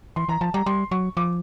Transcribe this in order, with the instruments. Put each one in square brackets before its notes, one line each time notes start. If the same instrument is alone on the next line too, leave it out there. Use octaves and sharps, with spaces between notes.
[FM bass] E3 [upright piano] C6
[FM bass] E3 [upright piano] A#5
[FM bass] F3 [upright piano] A5
[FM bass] G3 [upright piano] A#5
[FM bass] G3 [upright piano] C6
[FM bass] F#3 [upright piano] C#6
[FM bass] F3 [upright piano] D6